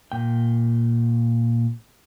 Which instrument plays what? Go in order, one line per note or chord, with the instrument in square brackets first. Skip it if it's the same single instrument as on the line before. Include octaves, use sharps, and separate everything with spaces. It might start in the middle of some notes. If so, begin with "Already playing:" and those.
[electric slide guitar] A#2 G5